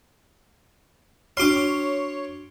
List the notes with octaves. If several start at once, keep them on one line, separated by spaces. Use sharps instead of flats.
D4 F#4 C#5 C6 D6 F6